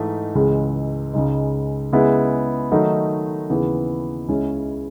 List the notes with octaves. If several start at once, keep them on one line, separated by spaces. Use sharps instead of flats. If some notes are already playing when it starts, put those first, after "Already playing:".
Already playing: G#2 E3 A3 D#4
C#2 C#3 E3 G#3
C#2 C#3 G#3 D#4
C#3 G#3 B3 E4
D#3 F#3 A3 D#4
D#2 C#3 E3 B3
C#2 C#3 G#3 C#4 E4